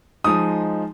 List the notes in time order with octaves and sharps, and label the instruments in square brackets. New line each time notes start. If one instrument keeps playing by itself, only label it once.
[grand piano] F3 G#3 D#4 D#6